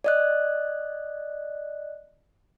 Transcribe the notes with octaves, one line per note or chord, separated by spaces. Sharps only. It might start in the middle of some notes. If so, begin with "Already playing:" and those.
D5 D#5 F#6